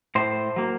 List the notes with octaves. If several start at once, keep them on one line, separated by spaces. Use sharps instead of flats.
A2 C5
F#3 A#3